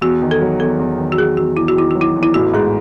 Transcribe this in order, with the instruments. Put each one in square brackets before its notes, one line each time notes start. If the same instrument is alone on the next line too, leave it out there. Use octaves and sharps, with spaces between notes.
[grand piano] E2 [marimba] F#4
[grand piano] D#3
[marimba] A4
[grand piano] F#3
[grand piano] E2 [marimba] A4
[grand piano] E2
D#3
[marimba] F#4
[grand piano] F#3 [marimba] G#4
[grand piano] E2 [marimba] F#4
[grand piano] E2 [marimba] E4
[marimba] F#4
[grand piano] D#3 [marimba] E4
[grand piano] F#3 [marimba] F#4
[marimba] E4
[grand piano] E2
[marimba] E4
[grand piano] A1 [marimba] F#4
[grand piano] G#2 [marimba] G#4